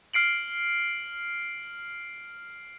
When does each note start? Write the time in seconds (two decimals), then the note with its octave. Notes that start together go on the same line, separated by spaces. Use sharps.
0.14 F6 C7 D7 F#7